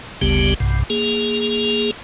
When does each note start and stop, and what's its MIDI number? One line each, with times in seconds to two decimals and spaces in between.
0.21 0.54 31
0.21 0.54 38
0.21 0.54 49
0.21 0.54 55
0.21 0.54 59
0.21 0.54 67
0.60 0.84 35
0.60 0.84 43
0.60 0.84 48
0.90 1.91 58
0.90 1.91 68